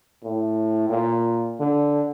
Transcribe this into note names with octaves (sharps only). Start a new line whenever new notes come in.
A2
A#2
D3